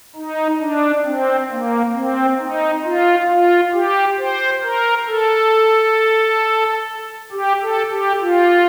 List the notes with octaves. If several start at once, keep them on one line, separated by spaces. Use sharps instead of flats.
D#4
D4
C4
A#3
C4
D#4
F4
F4
G4
C5
A#4
A4
G4
A4
G4
F4